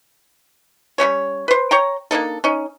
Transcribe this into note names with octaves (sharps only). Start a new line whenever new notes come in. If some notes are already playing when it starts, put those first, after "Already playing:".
G3 A#3 C#4 C#5
B4 C5
C#5 G5 A#5
A#3 D4 D#4 A4
C#4 D#4